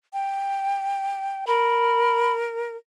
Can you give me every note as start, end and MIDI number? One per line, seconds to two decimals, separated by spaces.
0.13 1.45 79
1.47 2.76 70
1.47 2.33 83